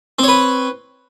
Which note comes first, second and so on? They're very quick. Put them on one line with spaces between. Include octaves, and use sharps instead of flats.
C4 C#5 B4